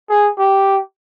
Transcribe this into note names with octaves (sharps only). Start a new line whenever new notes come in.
G#4
G4